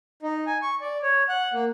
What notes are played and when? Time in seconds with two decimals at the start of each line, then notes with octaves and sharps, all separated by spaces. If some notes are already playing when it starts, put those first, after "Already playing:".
0.22 D#4
0.46 G#5
0.62 C#6
0.81 D5
1.02 C#5
1.29 F#5
1.54 A#3